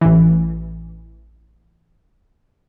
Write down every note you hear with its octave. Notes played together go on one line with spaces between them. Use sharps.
A1 E3